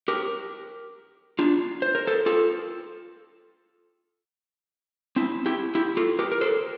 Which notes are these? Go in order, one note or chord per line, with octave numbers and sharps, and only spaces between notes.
G4 A#4
D4 F4
C5
A#4
A4 C5
F4 A4
C4 E4
E4 G4
E4 G4
F4 A4
G4 A#4
A#4
A4 C5